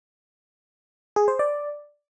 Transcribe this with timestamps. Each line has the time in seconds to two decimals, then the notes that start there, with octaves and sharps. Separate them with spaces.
1.16 G#4
1.28 C5
1.39 D5